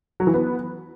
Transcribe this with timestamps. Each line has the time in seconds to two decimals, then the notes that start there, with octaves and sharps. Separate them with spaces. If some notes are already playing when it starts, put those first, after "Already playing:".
0.20 F#3
0.27 E3
0.34 B3